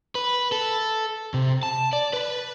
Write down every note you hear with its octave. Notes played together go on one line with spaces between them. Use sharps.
B4
A4
C3
A5
D5
B4